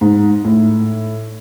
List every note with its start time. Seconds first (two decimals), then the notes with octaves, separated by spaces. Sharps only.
0.01 G#2
0.45 A2